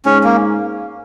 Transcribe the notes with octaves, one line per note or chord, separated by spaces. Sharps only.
G#2 C#4
A#3